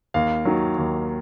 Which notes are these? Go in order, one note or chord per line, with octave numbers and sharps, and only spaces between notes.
D#2 F5
D#3 F#3
D#2